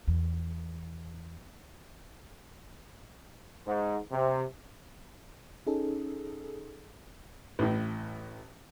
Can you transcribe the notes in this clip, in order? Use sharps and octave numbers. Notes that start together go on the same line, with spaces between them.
E2
G#2
C3
C#4 D#4 G#4 A4
A1 A2